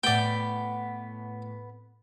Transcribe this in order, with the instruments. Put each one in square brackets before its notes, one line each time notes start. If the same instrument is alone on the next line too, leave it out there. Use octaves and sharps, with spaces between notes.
[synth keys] A2 A3 [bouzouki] B3 [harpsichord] D5 G5